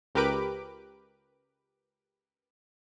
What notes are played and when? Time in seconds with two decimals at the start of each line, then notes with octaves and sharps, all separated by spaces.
0.15 C#2 G4 A#4 B4 D6 D7